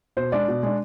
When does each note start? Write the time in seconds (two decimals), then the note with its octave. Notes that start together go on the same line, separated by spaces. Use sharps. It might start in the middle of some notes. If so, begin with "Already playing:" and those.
0.17 B2 C5
0.32 G#3 D4 D5
0.48 B2
0.63 G#3 D4